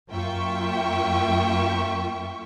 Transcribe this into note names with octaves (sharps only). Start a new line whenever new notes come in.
F#2 A#3 F4 E5 G5 C#6